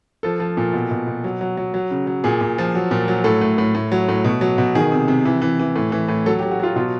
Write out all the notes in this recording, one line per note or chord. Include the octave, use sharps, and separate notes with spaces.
F3 A4
F3
A#2
B2
B2
B2
F#3
F#3
F#3
F#3
C#3
F#3
A#2 G#4
A#2
F3
F#3
A#2
F#3
A2 A4
A2
A2
A2
F#3
A2
B2
F#3
B2
D#3 G#4
C3
C3
E3
E3
E3
A2
E3
A2
F#3 A4
G4
F#3
F#4
F#3 F4
B2 F4